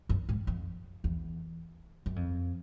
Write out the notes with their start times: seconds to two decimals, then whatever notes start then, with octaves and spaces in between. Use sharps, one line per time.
0.09 F#2
0.29 G#2
0.47 F2
1.04 E2
2.06 F#2
2.16 F2